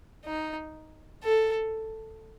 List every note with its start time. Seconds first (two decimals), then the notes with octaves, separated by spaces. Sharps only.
0.25 D#4
1.23 A4